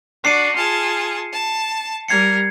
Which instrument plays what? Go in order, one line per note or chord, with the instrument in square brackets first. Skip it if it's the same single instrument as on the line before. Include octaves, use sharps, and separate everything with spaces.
[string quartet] D4 F#4 [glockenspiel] C7 C#7 D#7
[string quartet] F4 G#4 A5
A5
[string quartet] G3 A#4 [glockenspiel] G#6 C7 C#7